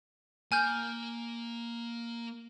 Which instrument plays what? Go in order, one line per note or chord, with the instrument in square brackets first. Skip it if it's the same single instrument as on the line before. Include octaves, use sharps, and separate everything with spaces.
[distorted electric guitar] A#3 [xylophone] G#5 F6 G6